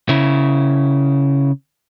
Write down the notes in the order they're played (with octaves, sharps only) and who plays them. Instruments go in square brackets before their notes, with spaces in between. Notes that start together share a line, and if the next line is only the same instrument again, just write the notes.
[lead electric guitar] C#3 E4